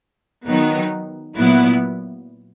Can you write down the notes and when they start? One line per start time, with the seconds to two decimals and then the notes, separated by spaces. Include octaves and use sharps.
0.47 D#3 F#3 B3 D#4
1.37 A#2 F#3 B3 E4